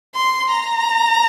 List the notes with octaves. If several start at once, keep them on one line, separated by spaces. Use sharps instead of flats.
C6
A#5